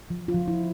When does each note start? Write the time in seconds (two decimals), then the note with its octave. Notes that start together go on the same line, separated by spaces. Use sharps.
0.10 F3
0.28 F4
0.34 F3
0.48 E4